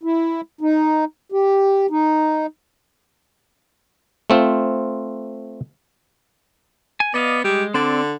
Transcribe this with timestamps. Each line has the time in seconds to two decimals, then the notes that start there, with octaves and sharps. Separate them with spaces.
0.03 E4
0.61 D#4
1.32 G4
1.90 D#4
4.30 A3 C4 F4
7.00 G#5
7.14 B3 D5 D#5 F5
7.44 G3 G#3
7.74 D3 C4 D5